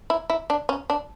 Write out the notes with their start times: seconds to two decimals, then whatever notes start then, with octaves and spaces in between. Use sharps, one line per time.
0.10 E4
0.30 E4
0.50 D4
0.69 C#4
0.90 D4